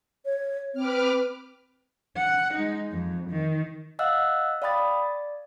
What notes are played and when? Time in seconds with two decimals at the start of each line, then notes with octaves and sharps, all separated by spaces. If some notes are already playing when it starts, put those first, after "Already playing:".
0.25 C#5
0.74 C4 B4 D6 F6
2.17 F#5
2.53 G#3 D#4
2.92 F2
3.30 D#3
3.99 D#5 F5 F#5 E6 F#6
4.62 D5 F5 G5 B5 D#6 A6
4.78 D5